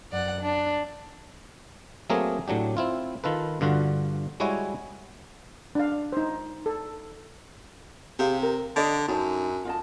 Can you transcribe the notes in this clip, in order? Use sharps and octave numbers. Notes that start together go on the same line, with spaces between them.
F#2 D5 F#5
D4
F#3 A3 A#3 C4 G#4 A#4
A2 F#3 D4 G4
C4 E4 F4
D#3 F4 A4 B4
G2 D3 F4 F#4
G3 G#3 E4 F#4 C#5 G#5
D4 F5
D#4 C5
A4
C3 G4 G#4 F5
A#4
D3 D5 D#5
F#2 D#4 C#5 A5
F4 D#5 A5